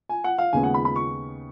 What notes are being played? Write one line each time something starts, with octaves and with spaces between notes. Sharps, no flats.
G#5
F#5
F5
D#2 C#3 G#3 B3 G#5
F#5
B5
B5
C#6